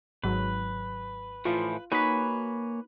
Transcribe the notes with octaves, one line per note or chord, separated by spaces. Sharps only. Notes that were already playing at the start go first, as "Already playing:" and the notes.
G#1 G#2 F#3 B4
A2 E3 F3 F4
A#3 D#4 F#4 B4 C#5 G#5 B5 F#6